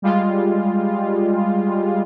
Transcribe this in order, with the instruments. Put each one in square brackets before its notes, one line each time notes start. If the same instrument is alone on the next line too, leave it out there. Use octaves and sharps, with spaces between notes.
[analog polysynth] G3 G#3 F4